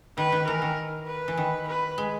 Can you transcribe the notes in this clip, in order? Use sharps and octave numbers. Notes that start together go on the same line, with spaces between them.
D#3 B4
D#3
E3 A#4
D#3
B4
E3
D#3
B4
G#3